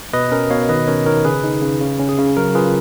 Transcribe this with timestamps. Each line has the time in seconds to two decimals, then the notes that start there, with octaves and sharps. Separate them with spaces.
0.13 B2 B4 D#5
0.32 C#4 A#4
0.50 B2 C#5 F5
0.69 D#3 B4 D#5
0.87 C#4 A#4 C#5
1.06 D#3 A#4 C#5
1.24 C#3 G#4 B4
1.43 D#4
1.62 C#3
1.81 C#3
1.99 C#4
2.09 G#4
2.18 C#3
2.37 F#3 A#4
2.55 F4 G#4 B4